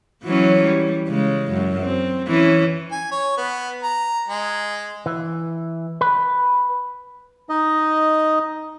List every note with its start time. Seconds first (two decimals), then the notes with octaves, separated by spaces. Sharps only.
0.24 E3 F#3 C#4
0.64 G3
1.09 C#3 G#3
1.52 F#2
1.82 C4
2.27 E3 C#4
2.91 G#5
3.11 C#5
3.37 B3
3.83 A#5
4.28 G#3
5.06 E3
6.01 B4
7.49 D#4 D#5